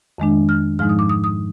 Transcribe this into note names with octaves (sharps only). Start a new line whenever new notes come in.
F2 D#3 G#3 D4
F6
G#2 F3 G#3 D#4 F6
D#6
D6
D#6
D#6